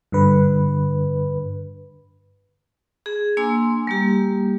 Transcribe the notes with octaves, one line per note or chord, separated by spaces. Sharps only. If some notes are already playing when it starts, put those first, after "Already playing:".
G2 D3 B4
G#4
A#3 D4 G#5 C6 E6
G3 A#3 G4